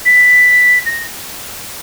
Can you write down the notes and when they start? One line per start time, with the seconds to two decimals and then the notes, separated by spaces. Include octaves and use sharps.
0.05 B6
0.86 A#6